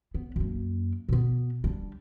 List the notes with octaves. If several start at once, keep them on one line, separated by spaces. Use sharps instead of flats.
B3
F#2 A#3
B2 B3
G3 D4